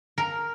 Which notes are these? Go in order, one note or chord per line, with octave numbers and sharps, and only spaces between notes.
A#4